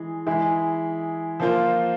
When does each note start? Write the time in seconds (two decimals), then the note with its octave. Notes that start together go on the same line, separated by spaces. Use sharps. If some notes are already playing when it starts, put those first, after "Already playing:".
Already playing: E3 G#3 G#4
0.27 E3 G#3 E4 G#4
1.40 F3 A#3 F4 C5